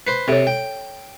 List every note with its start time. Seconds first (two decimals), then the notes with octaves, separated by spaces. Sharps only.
0.07 B4 C5
0.28 C3 A4 C#5
0.47 G5